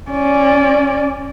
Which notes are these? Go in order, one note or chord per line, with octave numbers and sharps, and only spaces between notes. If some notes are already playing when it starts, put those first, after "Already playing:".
C#4 D5